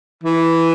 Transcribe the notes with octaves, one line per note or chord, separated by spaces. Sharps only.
E3